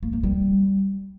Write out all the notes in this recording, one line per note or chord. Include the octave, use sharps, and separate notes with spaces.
A#3
A#3
G3